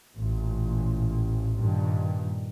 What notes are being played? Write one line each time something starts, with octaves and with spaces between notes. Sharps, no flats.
A1 A#2
G2 A#2 D#3